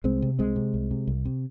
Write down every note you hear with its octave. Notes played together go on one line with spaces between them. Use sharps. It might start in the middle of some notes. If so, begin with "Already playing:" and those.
C2 G#3 C4
C3
C2 G#3 C4
C3
C2
C3
C2
C3